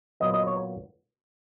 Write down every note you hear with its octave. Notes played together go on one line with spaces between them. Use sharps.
A#2 F#3 B3 D#5
D#5
C#5